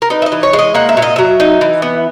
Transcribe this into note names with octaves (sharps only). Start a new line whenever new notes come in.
A#4
D#4 B4
E5
D#5
E3
C#5
G#3
D#5
A#3 F#5
E5
A#2
D#5
F#3 E5
D#4
E3
B3